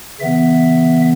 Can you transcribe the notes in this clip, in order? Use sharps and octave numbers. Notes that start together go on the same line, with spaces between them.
C#3 E3 B3 E5